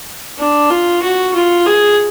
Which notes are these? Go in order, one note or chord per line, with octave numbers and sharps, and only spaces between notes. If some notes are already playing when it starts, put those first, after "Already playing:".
D4
F4
F#4
F4
G#4